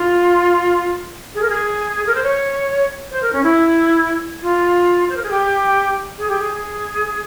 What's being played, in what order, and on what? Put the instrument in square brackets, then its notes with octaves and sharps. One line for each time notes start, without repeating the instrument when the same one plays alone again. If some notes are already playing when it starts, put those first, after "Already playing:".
Already playing: [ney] F4
G#4
A#4
G#4
A#4
C5
C#5
C5
A#4
C#4
E4
F4
C5
A#4
G#4
G4
G#4
G4
G#4